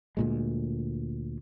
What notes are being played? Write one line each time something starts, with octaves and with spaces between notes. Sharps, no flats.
D2 A#2 G#3